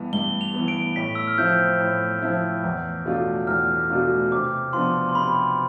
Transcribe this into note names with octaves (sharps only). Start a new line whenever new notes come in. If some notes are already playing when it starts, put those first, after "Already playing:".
Already playing: G2 E3 B3
G2 G7
F7
B3
E3
D7
A2 B6
E6
F6
F3 C4 E4 G6
A2
F3 C4 E4
E2
B2 A3 D4 F4
E2 F6
B2 A3 D4 F4
C3 D6
F3 B3 D4 C6
C6
C3 B5